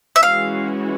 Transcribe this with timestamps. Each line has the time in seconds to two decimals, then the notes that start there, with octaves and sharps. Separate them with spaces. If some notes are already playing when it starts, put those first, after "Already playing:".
0.16 E5
0.22 E3 G#3 C#4 F#4 F5